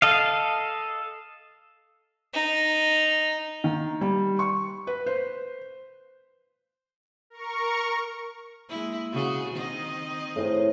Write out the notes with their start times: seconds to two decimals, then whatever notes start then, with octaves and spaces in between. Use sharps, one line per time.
0.02 A4 D#5 F5
2.34 D#4
3.64 D#3
4.01 G3
4.39 C#6
4.87 B4
5.06 C5
7.30 A#4 C#6
8.69 G#3 A#3 E4
9.12 C#3 F#4 G#4
9.55 D#3 C4 D#5
10.36 A2 C5 A#5